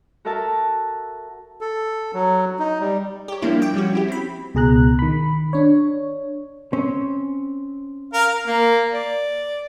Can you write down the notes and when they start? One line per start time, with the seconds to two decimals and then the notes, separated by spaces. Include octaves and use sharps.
0.25 F#4 A4 A#4 E5 A5
1.61 A4
2.14 F#3
2.59 D#4
2.80 G3
3.28 G4 C#5
3.42 F3 G3 A#3 D4 E4 F4
3.62 G5 D6
3.74 F3 G3 C#4 F#4
3.93 C#4 E4 G4
4.08 C4 B5
4.54 C#2 B2 G#4 A#5 F#6
4.99 D#3 B5
5.53 D4 C#5
6.73 C4 C#4 C5
8.14 A#4 F5
8.47 A#3
8.93 D5